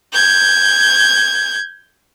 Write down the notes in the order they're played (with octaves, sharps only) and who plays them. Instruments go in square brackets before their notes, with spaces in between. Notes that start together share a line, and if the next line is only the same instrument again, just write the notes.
[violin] G6 G#6